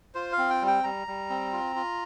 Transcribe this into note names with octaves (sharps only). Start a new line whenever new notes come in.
F4 C5
F5
C4
G5
G3
G5
G3 A#5
G3
C4
F4
F4